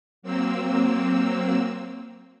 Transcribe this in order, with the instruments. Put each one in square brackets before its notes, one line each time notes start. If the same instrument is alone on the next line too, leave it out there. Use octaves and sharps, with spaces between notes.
[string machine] F#3 A#3 C4 E6